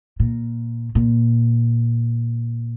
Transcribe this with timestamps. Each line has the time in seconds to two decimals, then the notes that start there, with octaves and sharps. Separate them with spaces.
0.20 A#2
0.95 A#2